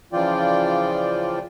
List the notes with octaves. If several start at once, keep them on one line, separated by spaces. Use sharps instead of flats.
C#3 E3 F3 F4 D5 G5